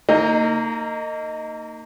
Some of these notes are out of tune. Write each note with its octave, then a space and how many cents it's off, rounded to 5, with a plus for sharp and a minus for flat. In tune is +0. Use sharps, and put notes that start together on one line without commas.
A#3 -30 D#4 +0